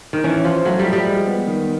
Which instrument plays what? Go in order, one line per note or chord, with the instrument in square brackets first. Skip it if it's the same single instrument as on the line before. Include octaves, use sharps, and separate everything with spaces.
[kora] D#3
[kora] E3 [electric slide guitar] C#4
[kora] F3 [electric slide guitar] F4
[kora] F#3 [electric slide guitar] A3
[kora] G3
[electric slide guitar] F3
[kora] G3
[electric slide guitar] G#3
B3
D#3